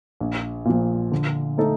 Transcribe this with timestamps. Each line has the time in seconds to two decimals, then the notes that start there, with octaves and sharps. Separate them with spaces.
0.21 A#1
0.65 A#2 F3
1.12 D3
1.58 A3 D#4 A4